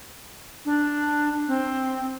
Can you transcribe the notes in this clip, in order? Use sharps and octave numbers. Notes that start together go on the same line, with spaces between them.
D4
C4